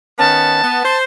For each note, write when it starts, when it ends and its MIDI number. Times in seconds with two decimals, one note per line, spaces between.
0.19 0.62 51
0.19 0.62 59
0.19 0.62 61
0.19 0.98 81
0.63 0.81 59
0.85 1.04 72